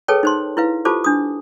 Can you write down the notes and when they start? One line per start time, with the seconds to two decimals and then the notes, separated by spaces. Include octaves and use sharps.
0.08 G#4 A4 B4 C#5 G5 A5
0.23 D#4 C5 C6
0.57 E4 B4 F5
0.85 F4 G4 A4 C5 A5 D6
1.04 D4 D#6